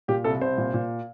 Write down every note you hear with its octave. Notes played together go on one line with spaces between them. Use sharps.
A#2 G4
C2 A4
C2 C5
A#2
A#2